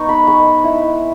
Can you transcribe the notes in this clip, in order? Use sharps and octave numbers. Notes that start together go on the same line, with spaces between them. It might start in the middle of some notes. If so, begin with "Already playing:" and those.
Already playing: B3 D#4 C#6
B5
G#3 C#6
E4